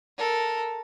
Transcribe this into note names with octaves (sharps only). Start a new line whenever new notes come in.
A4 A#4